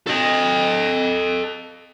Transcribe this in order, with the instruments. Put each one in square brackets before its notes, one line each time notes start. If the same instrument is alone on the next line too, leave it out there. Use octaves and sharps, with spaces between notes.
[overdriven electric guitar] A4 D#5